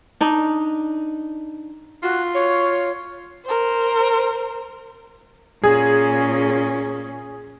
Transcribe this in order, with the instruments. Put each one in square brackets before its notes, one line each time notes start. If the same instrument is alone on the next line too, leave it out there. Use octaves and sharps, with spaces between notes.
[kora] D4 D#4
[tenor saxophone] F4 [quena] F#4
[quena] C#5
[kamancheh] A#4 C5
[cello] A#2 C#4 [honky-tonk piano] G#4